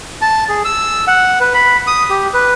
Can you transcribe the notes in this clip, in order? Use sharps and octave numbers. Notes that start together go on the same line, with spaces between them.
A5
G#4
E6
F#5
B4
B5
D#6
G4
B4